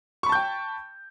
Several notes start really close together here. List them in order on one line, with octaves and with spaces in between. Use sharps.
C#6 B5 A5 G6 G5